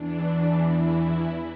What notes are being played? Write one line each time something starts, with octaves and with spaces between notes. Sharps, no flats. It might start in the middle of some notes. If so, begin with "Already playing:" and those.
Already playing: E2 E3 D4
E4